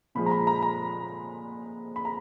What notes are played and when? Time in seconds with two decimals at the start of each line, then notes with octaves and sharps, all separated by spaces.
0.15 A#2 F3 G#3 B5
0.26 A#5
0.31 B5
0.47 A#5
0.62 A#5
1.96 B5
2.05 A#5